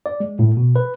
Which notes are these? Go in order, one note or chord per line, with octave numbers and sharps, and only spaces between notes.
D5
G#3
A2
B2
B4